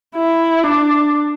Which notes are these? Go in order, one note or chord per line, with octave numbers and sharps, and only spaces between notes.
E4
D4